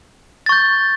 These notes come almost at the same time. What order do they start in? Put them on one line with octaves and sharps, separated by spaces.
A6 C#6 G6